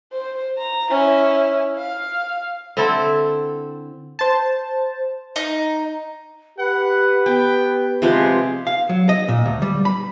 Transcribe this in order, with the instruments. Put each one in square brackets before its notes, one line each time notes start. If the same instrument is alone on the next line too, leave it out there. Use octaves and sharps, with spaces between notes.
[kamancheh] C5
A#5
C#4 E4
F5
[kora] D3 C4 E4 A4
[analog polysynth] C5 A5
[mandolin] D#4
[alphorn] G4 [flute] B4 [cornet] F#5
[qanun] B3 [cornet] G5
[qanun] C3 F3 G#3 [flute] G#4 [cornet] B4
[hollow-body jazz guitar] F5
F#3
D#5
A#2
D2
G3
B5